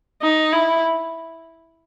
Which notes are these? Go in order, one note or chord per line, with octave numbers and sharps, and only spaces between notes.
D#4
E4